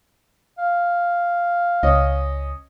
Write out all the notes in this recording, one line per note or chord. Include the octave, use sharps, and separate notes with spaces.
F5
C#2 C#4 D#5